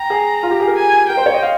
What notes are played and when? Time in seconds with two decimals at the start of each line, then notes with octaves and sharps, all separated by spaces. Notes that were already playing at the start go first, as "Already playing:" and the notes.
Already playing: G5 A#5
0.10 G#4
0.43 F4
0.51 G4
0.60 G#4
0.67 A#4
0.76 G#5
1.09 A#4 G5
1.17 C5
1.26 C#5
1.34 D#5
1.43 F5